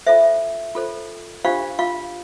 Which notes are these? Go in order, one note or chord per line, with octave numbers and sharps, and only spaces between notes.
F4 A4 C5 E5
F4 A4 C5
D4 F4 G4 C5 F5
F4 F5